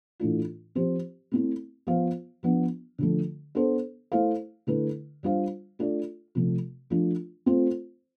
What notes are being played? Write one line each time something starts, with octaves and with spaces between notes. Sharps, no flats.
A2 E3 A3 D4 F4
F3 C4 G4 C5
A3 C4 E4
F3 B3 F4 C5 F5
F3 B3 D4
D3 F3 A3
B3 D4 A4 C5
A3 E4 A4 C5 F5
D3 A3 E4 B4
G3 D4 F4 C5 F5
A3 D4 F4 A4 D5
C3 F3 A3
F3 A3 D4 F4
A3 C4 F4 C5